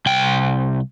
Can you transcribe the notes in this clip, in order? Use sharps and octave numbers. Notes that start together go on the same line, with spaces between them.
C2 G5